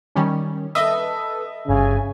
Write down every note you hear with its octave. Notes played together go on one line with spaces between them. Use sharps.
D#3 G3 C#4
A4 B4 D#5 E5
G1 G2 C#3 G#5